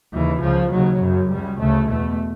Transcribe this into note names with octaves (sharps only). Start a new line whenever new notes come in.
D#2 C#3 E3
C#2 C#3 F3
D#2 C#3 F#3
F#2 C#3
C#2 C#3 G3
D2 C#3 A3
E2 B2 A3